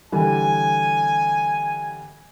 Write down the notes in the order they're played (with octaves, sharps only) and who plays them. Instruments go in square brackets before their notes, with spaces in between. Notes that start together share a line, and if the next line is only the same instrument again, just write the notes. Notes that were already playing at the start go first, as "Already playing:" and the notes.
[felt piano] D3 E3 G3 [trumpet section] G#5